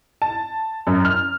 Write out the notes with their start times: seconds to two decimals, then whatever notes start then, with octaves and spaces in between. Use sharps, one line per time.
0.22 A5
0.87 F#2
1.05 F6